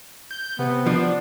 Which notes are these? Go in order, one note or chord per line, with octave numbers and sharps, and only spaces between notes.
G6
C3 B3
F3 D4